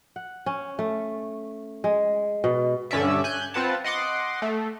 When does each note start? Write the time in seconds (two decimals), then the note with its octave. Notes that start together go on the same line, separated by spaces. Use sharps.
0.16 F#5
0.46 C#4
0.79 A3
1.84 G#3
2.44 B2
2.91 G2 D3 C#4 D5 E5
3.24 G#5 F#6 G6
3.54 C4 F4 B4 F#5 A5
3.84 D#5 F#5 C6 D6
4.42 A3